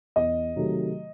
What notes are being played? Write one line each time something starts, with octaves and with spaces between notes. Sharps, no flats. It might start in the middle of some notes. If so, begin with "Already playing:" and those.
E2 D#5
C3 D#3 F#3 A3